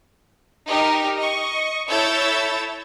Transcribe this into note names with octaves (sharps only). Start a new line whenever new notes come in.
D#4 G4 A#4 D#5
D#5 C#6
E4 A4 C#5 E6 G6 A6